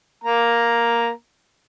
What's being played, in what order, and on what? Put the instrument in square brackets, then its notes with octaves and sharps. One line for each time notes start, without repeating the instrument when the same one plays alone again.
[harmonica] A#3 A#5